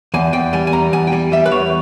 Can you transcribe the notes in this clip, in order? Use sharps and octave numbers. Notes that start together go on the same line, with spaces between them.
E2 G#5
E2 G5
G3 G#5
G#5
E2 A#5
E2 G#5
G5
G3 G#5
G3 E5
B4
E2 C#5